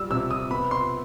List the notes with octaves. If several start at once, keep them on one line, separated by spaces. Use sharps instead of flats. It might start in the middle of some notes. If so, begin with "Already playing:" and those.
Already playing: G3 E6
C3 E6
D#6
B3 B5
C6